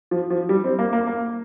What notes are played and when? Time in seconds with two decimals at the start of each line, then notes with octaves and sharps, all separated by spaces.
0.11 F3
0.30 F3
0.49 G3
0.64 C4
0.79 A#3
0.93 A#3
1.07 A#3